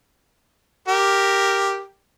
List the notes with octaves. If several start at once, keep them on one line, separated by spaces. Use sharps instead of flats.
G4 A#4